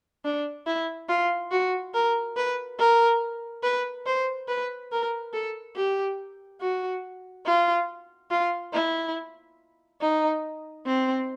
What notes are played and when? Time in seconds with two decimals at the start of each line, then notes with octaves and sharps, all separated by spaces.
0.24 D4
0.66 E4
1.09 F4
1.51 F#4
1.94 A#4
2.37 B4
2.79 A#4
3.63 B4
4.06 C5
4.48 B4
4.92 A#4
5.33 A4
5.76 G4
6.61 F#4
7.46 F4
8.31 F4
8.73 E4
10.01 D#4
10.86 C4